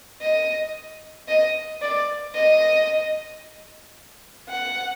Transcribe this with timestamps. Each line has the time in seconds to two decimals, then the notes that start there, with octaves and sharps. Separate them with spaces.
0.22 D#5
1.28 D#5
1.82 D5
2.35 D#5
4.49 F#5